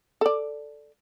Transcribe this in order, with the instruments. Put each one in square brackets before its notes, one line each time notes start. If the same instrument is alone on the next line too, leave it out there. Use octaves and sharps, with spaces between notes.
[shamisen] A4 D5